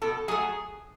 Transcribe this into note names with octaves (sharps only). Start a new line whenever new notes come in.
B2 A4
F#3 A3 G#4